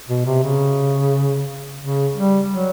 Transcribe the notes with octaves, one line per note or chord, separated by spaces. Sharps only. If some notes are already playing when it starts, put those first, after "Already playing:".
B2
C3
C#3
C#3
G3
F#3